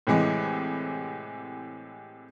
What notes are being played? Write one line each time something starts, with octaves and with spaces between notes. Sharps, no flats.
A2 C3 E3 G#3